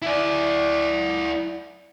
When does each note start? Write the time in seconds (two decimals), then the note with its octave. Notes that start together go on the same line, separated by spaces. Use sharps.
0.02 E4 D5